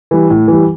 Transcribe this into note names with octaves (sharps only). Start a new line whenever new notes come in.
E3 G3
A2
E3 G3